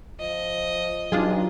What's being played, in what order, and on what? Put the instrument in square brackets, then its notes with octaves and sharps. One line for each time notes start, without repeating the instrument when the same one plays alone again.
[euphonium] F3 [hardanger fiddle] D#5
[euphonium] G2 [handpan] F#3 D#4 [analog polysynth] D4 F4 G#4